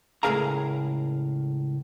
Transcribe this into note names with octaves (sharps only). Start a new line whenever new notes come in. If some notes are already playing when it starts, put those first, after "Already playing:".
C#2 A2 G#4 A#4 F5 A#5